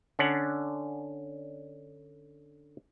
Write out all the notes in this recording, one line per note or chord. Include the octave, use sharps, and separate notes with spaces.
D3 C#4 D4 F#5